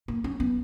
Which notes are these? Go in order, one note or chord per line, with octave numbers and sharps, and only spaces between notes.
A#3
C#4
B3